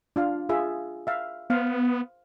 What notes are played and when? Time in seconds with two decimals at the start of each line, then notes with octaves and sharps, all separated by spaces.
0.16 D4 F4 F5
0.49 F4 G#4 E5
1.07 E5 F5
1.50 B3 C5 F5